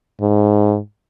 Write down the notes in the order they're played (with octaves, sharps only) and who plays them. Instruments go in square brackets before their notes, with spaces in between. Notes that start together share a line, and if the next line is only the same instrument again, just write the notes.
[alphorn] G#2